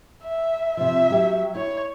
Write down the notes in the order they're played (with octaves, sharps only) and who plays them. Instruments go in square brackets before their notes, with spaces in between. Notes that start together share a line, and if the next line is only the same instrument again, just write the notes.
[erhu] E5
[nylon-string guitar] C3 F3 [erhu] E5
[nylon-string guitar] F#3 G4
[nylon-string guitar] E4 [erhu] C#5